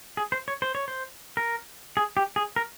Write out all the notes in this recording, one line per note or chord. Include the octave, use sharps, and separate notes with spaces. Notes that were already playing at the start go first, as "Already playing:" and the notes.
G#4
C5
C#5
C5
C#5
C5
A#4
G#4
G4
G#4
A#4